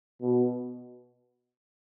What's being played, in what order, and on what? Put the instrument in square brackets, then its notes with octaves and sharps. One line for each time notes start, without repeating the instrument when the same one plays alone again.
[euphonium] B2